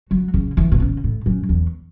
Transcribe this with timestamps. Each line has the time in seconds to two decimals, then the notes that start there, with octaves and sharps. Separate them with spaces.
0.11 F#3
0.34 C#3
0.57 E3
0.72 B2
0.80 C#3
1.04 A2
1.26 F#2
1.49 E2